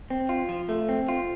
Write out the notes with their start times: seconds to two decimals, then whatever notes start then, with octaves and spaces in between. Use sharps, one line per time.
0.10 C4
0.29 F4
0.49 F3
0.69 A3
0.89 C4
1.09 F4